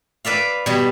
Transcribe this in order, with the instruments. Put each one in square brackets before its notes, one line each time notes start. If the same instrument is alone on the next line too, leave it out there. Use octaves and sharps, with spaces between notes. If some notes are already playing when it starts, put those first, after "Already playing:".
[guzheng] B4 D5 E5 F5
B2 G3